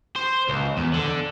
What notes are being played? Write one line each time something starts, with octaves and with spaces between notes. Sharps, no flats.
C5
C#2
E2
D3